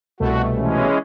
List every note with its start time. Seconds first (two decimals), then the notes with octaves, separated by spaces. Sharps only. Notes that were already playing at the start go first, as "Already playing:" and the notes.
0.20 C2 B2 A3 F#4
0.56 E3 G#3 C#4